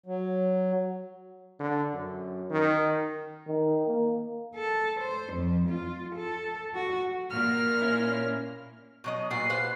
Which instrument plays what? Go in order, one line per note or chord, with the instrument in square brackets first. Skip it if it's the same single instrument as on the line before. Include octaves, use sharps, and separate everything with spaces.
[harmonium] F#3
[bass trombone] D3
F#2
D#3
[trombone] D#3
A#3
[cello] A4
C5
F2
F4
A4
F#4
[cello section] A#2 A#3 [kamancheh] F6
[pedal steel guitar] C#4 E4
[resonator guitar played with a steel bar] B2 F#3 D#5
[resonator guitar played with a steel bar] A#2 B3 F#4 [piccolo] C7
[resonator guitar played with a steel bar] B4 C5 F5